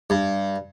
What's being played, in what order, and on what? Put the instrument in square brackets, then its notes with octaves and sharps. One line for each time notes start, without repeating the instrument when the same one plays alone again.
[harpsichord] G2